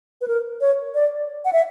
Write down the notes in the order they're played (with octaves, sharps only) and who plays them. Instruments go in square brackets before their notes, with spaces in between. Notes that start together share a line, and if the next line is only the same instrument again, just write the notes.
[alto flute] B4
A#4
C#5
D5
F#5
E5